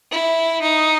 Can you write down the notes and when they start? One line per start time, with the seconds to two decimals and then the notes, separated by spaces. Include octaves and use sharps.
0.12 E4
0.62 D#4